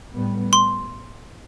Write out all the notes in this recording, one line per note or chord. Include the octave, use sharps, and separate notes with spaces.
A2 G3 B3
C6